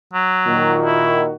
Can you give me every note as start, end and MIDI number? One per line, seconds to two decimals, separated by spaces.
0.14 0.77 54
0.46 1.34 46
0.46 1.34 51
0.46 1.34 66
0.85 1.22 64